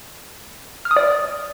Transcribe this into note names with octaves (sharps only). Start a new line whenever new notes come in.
F6
D#6
D5